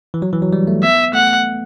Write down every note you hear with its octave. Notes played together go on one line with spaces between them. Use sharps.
E3
F#3
E3
F#3
G3
A3
B3 E5
A3 F#5